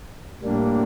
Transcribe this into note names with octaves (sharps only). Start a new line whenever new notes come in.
A2 G3 A#3 D4